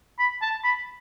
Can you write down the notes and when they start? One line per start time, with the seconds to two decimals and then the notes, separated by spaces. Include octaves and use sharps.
0.19 B5
0.42 A5
0.64 B5